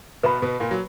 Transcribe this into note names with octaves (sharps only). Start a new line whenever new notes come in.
B2 B3 B4 F#5 B5
B2 B3
A#2 A#3
F#3